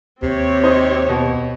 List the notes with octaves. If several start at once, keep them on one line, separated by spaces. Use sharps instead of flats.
D#2 C3 C4 G4 C#5
D#4 C5 D#5
B2